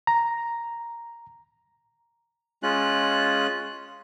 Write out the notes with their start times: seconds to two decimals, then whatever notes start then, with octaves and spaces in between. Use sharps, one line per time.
0.07 A#5
2.63 G#3 C#4 F4 F#6